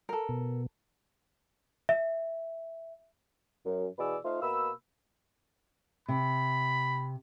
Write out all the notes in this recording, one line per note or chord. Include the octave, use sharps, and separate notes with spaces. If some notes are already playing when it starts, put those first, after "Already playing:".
A4 A#4
B2
E5
F#2
B2 E3 G#4 B4 D5 E6
A3 D#4 F4 C5 F5
B2 A#3 B5 E6
C3 B5